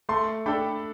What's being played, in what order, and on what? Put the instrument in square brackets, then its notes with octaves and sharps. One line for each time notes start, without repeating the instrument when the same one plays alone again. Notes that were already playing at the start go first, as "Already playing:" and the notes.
[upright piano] A3 [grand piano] A5 C6
[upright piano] D4 A4 [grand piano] G5 B5